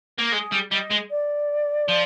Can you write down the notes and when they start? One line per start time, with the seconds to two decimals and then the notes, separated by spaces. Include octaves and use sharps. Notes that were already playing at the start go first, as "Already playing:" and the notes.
0.19 A#3
0.32 G#3 G#4
0.52 G3
0.71 G3 D#5
0.90 G#3
1.10 D5
1.88 F3